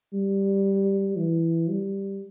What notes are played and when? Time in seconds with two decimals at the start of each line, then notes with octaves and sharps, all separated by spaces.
0.13 G3
1.16 E3
1.69 G3